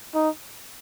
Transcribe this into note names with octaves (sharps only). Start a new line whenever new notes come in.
D#4